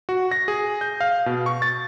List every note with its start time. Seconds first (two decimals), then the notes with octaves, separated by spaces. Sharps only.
0.09 F#4
0.31 A#6
0.48 G#4
0.81 G6
1.01 F5
1.26 B2
1.46 C#6
1.62 A6